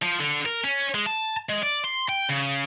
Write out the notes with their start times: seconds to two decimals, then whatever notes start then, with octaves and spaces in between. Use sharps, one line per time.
0.03 F3
0.20 D3
0.46 A#4
0.64 C#4
0.95 G#3
1.07 A5
1.49 G#3
1.62 D5
1.84 C6
2.08 G5
2.29 C#3